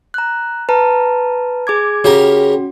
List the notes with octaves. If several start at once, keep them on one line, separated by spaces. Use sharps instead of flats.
A#5 F#6
B4 A5 A#5
G#4 D6 G#6
C#3 C#4 F#4 G4 A#4